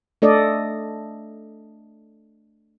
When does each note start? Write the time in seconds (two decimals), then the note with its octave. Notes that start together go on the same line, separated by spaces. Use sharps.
0.22 A3 D4 A4 D5 D#5